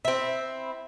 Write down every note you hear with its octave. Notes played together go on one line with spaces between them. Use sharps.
C4 E4